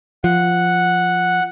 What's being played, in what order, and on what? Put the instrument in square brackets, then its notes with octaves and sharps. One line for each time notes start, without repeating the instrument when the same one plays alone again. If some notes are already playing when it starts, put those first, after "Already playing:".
[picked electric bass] F3 [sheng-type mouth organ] F#5